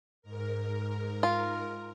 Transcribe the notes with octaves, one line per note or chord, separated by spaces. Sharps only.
G#2 A#4
F4